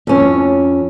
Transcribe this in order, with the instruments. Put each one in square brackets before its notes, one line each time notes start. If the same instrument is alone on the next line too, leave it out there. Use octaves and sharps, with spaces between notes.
[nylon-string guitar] F2 C#4